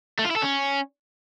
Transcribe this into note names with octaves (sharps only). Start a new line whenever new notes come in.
A3
F4
E4
A4
C#4